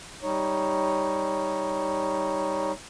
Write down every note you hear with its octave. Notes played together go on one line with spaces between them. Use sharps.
G3 D#4 C#5